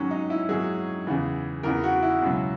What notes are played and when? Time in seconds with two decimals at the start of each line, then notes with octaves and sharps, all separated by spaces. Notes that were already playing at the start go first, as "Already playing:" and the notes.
Already playing: G#2 D#3 F#3 C#4
0.11 D#4
0.30 E4
0.49 G#2 D#3 F#3 G#4
1.07 E2 C#3 E3
1.63 E2 C#3 E3 A#4
1.83 F#4
2.02 E4
2.22 C#2 B2 F#3